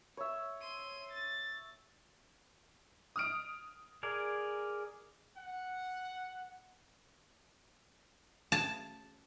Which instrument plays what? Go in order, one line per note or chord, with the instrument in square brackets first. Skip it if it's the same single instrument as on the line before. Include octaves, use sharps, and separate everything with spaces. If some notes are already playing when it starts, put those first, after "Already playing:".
[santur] C#5 E5
[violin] C6 D#7
A6
[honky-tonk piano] D#6 F6 D7
[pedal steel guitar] G#4 A#4 D5
[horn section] F#5
[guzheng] A5